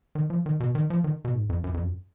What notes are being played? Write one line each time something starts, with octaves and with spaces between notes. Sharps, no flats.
D#3
F3
D#3
B2
D#3
F3
D#3
B2
G#2
F2
F#2
F2
F#2